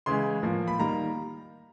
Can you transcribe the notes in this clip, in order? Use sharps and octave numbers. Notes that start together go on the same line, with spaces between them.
C#3 E3 G#3 C6
A2 F3 A#3
B5
D#3 G3 A#3 A#5